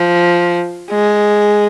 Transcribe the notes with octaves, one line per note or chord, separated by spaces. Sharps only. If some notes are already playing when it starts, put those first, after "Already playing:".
Already playing: F3
G#3